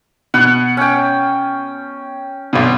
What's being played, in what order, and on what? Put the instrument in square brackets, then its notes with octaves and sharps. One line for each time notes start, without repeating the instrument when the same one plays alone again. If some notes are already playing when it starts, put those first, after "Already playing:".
[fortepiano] B2 [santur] F#5
[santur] C#4 G5
[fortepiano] B1 B2